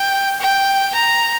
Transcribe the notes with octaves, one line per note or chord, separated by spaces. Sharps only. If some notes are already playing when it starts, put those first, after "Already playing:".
Already playing: G5
G5
A#5